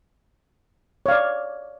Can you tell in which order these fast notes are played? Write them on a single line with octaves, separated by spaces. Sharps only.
C#5 F5 D5